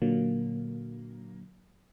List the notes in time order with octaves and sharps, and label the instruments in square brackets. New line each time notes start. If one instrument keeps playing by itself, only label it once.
[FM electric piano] A#2 D3 F#3 [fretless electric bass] A#3